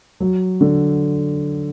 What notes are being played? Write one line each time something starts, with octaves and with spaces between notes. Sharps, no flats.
F#3
D3